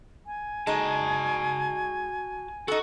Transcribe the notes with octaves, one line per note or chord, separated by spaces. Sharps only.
G#5
G#3 D#4 F#4 A5
D#4 F#4 A4